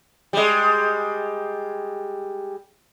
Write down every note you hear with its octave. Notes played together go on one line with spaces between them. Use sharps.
G3 G#3